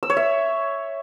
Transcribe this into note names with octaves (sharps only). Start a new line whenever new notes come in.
E6
C#5
E5